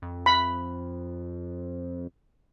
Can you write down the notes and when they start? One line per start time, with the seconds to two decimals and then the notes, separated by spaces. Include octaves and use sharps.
0.02 F2
0.26 B5